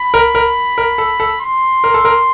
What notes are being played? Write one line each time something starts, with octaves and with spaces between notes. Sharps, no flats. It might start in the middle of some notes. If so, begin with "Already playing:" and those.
Already playing: B5
A#4
A#4
A#4
A4
A4
C6
A#4
A4
A#4